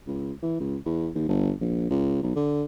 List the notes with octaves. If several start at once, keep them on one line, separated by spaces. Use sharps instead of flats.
C#2
E3
C#2
E2
D#2
G1
A#1
C#2
B1
D3